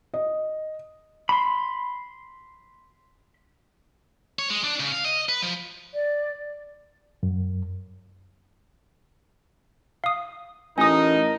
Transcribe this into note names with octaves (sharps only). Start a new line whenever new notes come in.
D#5
B5 C6
C#5
G#3
D4
C#3
F5
D#5
B4
F3
D5
F#2
F5 D#6
A1 D#4 A#4 D#5 G#5 D#6